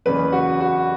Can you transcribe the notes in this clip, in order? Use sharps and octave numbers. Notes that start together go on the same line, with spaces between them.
F#1 E2 C#3 B4
F#4
F#4